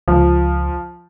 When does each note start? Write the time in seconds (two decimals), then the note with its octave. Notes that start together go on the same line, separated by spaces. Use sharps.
0.08 C#2 F3